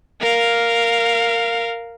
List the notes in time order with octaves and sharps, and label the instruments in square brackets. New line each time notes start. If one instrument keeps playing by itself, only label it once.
[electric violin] A#4 F5